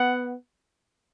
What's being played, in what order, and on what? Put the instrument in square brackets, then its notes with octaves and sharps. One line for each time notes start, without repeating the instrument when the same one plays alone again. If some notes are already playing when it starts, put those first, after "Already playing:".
Already playing: [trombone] B3 [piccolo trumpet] F#5